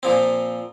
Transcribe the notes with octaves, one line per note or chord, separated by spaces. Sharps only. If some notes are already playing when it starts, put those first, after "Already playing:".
A#2 F3 C4